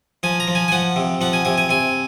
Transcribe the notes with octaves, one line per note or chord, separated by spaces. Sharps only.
F3 G#5
A#5
F3
G#5
G#5
F3 F#5
C3
F3 F#5
G#5
C3 G#5
G#5
C3 G#5